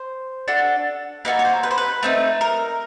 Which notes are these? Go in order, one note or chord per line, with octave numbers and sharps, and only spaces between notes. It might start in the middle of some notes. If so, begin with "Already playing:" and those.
Already playing: C5
D4 F#4 A4
A#3 D#4 F#4 A4 B4
C#5
C5
B4
C5
B4
A3 C4 D#4
A#4